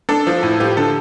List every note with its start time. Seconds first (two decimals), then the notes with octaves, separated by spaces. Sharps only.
0.09 D4 A4
0.27 F3
0.43 A2
0.60 F3 G4
0.77 D3 A4